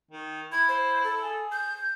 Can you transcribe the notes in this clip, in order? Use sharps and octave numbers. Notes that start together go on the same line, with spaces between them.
D#3
E4 G#6
C5
A4
G#4
G6